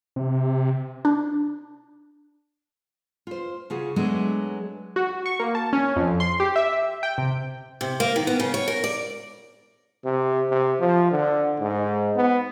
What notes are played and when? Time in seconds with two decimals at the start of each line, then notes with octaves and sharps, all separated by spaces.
0.16 C3
1.05 D4
3.27 F4 C5
3.70 C#3 F4 F#4 G#4
3.96 F#3 G#3 A3 B3 D4 G#4
4.96 F#4
5.26 C#6
5.40 A#3
5.55 A5
5.73 C#4
5.96 F2
6.20 C6
6.40 G4
6.56 E5
7.03 G5
7.18 C3
7.81 C3
8.00 A#3
8.16 D#3
8.27 B3
8.40 C#3
8.54 C#5
8.68 A#4
8.84 D5
10.05 C3
10.50 C3
10.79 F3
11.11 D3
11.60 G#2
12.16 B3